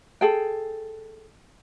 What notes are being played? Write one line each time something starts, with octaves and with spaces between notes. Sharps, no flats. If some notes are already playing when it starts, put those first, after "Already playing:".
G#4 A4 G5